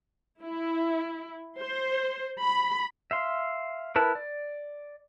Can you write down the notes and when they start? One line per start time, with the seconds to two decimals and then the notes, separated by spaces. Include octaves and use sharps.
0.41 E4
1.60 C5
2.40 B5
3.11 E5 F5 C6
3.96 E4 A#4 B4 A5
4.15 D5